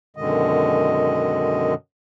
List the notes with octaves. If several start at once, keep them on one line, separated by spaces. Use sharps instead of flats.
F#2 B2 D3 D#3 G#3 D#5